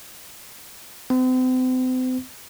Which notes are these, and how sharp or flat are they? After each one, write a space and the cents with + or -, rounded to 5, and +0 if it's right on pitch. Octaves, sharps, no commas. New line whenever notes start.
C4 -40